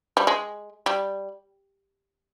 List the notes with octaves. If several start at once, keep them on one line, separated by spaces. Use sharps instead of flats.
G3
G#3
G3